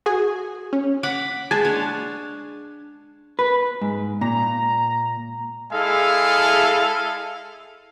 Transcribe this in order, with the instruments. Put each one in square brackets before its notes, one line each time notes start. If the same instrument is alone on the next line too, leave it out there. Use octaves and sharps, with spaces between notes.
[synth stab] F#4 G#4 G#5
C#4
[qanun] F#5 B5 D6
[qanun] G#3 [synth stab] G#5 A5
[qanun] D4 C#5
[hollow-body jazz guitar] B4
G#2
[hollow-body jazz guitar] A#2 [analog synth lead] A#5
[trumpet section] G#3 E4 G#4 A4 F5